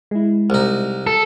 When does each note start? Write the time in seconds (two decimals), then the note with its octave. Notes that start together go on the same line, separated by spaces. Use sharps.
0.11 G#3 E4
0.50 C2 D#4
1.07 A4